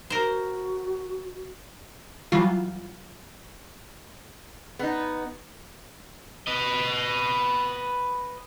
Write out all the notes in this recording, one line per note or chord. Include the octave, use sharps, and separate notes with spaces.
F#4 A#4 C5
E3 F#3 G3 F4
B3 D#4
B4 D#5